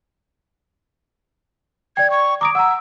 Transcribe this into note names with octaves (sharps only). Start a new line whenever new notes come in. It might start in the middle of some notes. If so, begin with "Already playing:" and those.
D5 G5 G#6
C#6
A#5 D6 D#6 D7
F#5 A#5 E6